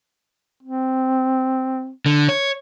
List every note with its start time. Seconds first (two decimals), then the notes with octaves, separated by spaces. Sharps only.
0.63 C4
2.06 D3
2.29 C#5